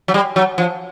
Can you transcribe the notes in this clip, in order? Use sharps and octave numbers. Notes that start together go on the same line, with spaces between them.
F#3
G3
F#3
F3